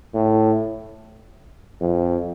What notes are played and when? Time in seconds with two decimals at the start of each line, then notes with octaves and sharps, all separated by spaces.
0.14 A2
1.81 F2